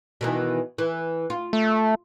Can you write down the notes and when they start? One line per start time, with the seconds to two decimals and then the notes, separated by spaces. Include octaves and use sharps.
0.21 B2 D#3 E3
0.78 E3
1.30 F4
1.53 A3